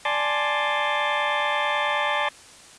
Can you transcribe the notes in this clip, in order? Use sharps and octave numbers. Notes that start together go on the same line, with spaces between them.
D5 G#5 A5 C6 D6